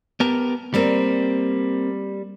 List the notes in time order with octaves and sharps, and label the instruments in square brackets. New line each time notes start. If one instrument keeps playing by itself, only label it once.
[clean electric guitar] B3 G4 A#4 [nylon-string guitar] A5
[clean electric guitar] G3 [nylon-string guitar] A#3 C4 D5